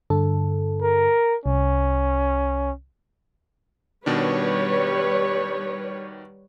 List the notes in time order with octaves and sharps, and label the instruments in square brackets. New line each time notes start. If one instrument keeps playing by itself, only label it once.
[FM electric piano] G2 D3 A4
[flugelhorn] A#4
[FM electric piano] C2 [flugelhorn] C#4
[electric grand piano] B2 D#3 D4 [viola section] G3 B4 C#5